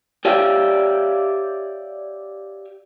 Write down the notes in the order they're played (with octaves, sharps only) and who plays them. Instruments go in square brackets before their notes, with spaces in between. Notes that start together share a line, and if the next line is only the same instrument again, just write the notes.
[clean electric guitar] G4 C#5 D5 E5 F5 G5